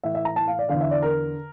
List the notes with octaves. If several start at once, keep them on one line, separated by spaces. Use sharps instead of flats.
A2 E3 E5
E5
A#5
A5
F5
D5
E2 D3 F5
E5
D5
A#4